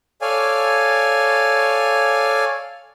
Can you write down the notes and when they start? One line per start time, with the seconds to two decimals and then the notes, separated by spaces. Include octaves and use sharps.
0.22 A4 C#5 D5 F5 G#5